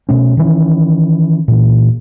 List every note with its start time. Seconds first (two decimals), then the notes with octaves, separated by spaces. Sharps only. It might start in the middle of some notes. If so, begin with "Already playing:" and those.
0.09 B2 A3 C#4
0.37 D#3 E3 C#4
1.48 A#2 E3